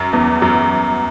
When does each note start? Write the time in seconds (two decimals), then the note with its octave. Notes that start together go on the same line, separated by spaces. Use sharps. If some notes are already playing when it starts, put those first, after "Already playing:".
Already playing: F#2
0.13 E2
0.42 F#2